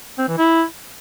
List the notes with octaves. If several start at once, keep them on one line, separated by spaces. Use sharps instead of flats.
C4
E3
E4